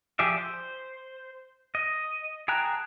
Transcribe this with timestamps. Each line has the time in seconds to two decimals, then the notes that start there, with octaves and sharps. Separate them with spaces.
0.19 F3 G4 G#4 D5 E5
0.38 C5
1.75 D#5
2.48 G#4 G5 A5 A#5 F#6